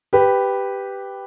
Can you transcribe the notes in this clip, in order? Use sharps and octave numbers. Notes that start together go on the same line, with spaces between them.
G4 B4